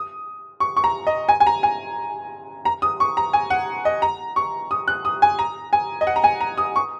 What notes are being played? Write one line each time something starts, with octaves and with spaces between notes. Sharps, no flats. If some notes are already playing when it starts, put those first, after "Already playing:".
Already playing: D#6
C#6
C#6
A#5
D#5
G#5
G#5
A#5
G#5
A#5
D#6
C#6
A#5
G#5
F#5
D#5
A#5
C#6
D#6
F#6
D#6
G#5
A#5
G#5
D#5
F#5
A#5
G#5
A#5
D#6
C#6